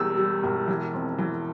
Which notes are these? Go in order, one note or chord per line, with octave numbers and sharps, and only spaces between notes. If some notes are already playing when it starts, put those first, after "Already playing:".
Already playing: E1 E2 E3 G3 E6
G3
E1
E3
F2
E3